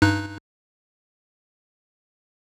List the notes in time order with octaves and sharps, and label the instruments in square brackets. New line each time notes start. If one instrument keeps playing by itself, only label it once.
[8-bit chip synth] G2 D#4 F#6